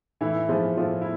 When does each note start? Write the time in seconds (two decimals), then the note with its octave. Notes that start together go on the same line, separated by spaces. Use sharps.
0.21 A2 E3 E4
0.49 F3 G#3 F4
0.77 A2 F3 F4
1.02 E4